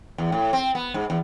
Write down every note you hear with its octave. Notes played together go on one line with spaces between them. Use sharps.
E2
A2
C4
B3
G#2
E2